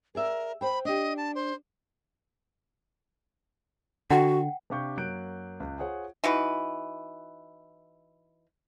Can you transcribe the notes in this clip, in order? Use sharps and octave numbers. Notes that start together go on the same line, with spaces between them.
G#4 A#4 D5 E5
C5 G5 B5
D4 G4 D#5
A5
C5
D3 F#4 F#5 G5
C3 D4 G4 F5 C#6 G6
F#2 F#3 A#3 F#6 G6 D7
C#2
F4 G#4 C5 C#5 F#5
E3 D#4 F#4 B4